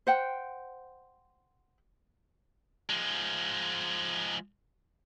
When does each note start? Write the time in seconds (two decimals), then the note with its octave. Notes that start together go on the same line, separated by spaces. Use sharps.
0.07 C5 F#5 G5
2.90 F3 G#3